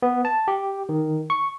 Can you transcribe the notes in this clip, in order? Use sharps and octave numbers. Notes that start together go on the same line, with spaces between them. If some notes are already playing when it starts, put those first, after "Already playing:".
B3
A5
G4
D#3
C#6